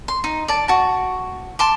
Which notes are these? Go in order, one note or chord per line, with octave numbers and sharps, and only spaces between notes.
C6
D#4
D5 A5
F#4 A5
A5 C6 D6